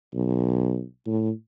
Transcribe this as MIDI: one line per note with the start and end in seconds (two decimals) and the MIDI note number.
0.14 0.83 35
1.06 1.31 45